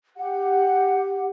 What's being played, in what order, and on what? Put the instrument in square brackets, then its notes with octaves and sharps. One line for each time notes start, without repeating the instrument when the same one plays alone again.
[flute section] G4 F#5